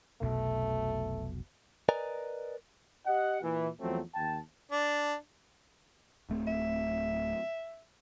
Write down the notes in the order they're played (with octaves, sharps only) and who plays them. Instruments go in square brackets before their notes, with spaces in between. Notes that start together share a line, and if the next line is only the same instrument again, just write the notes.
[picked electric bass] F1 B1 B2 [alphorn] A3
[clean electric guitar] A#4 B4 D5 D#5 G#5 A#5
[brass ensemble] G4 D#5 F#5
A#2 E3
E2 F3 F#3 A3 C4
D#2 G5 A5
[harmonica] D4
[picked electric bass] D1 A3 C4
[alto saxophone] E5